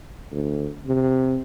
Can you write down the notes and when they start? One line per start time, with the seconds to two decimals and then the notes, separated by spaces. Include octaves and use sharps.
0.31 D2
0.87 C3